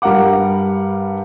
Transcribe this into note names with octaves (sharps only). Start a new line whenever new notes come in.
G2 G3 A#4 F5 F#5 D6